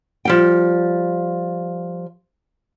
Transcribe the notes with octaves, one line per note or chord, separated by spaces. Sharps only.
F3 G3 G5